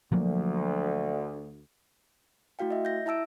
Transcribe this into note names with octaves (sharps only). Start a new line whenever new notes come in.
D2 F3 F#3 A#3
A3 E4 F#4 F5 G5
D#5 E5
G6 A#6
E4 E5 A5 E6 D7